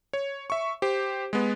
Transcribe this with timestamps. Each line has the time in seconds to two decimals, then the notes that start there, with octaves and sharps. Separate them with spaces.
0.13 C#5
0.50 E5 C#6
0.82 G4 C5
1.33 G#3 B3